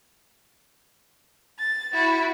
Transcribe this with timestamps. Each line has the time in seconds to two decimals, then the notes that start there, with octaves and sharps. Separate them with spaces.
1.59 A6
1.93 E4 F#4